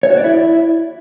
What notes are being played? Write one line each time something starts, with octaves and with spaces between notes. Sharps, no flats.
C#5
F#4
D5
E4